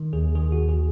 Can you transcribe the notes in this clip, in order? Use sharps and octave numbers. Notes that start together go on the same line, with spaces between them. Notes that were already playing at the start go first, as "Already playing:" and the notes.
Already playing: D#3
D#2 G#4
D#3 G#4
F#4
D#2
G#4